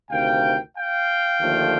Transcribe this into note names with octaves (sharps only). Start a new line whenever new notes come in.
D2 C3 D#3 F5 G5
F5 G5
D#2 D3 F3 A3